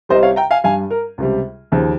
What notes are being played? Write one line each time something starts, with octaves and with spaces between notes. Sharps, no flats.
C2 C3 G3 C5 D#5
C#5 F5
G5 A#5
F5 G#5
G2 G3 F5 G#5
A#4
C#2 C3 G3
D#2 C#3 F3